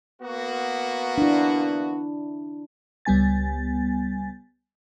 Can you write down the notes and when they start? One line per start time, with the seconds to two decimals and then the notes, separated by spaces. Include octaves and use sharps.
0.22 A#3 B3 F#4
1.18 D4 E4
3.05 C#2 G3 B3 G#5 A6